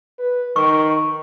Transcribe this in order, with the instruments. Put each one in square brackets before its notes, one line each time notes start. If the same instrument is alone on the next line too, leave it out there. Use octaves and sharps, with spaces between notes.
[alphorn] B4
[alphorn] D#3 [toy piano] C#6